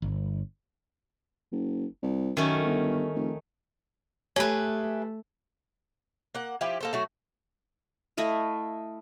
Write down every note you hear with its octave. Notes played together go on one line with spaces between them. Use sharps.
G1
F#1
C2
F#2 D#3 A3 C#4
G1
F1
A3 G4 G#4 B4 C#5 E5
A#3 F#5
F3 E4 G4
A#3 A4 C5
F#3 A3 F#4
A3 E4 D#5 F5